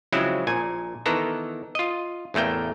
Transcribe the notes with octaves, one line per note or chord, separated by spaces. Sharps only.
C#3 F3 F#3 G#3 C4 E4
A#1 A#2 G#5
D#3 E3 B3 A4 A#5
F4 D#5
A1 E2 A3 A#3 G5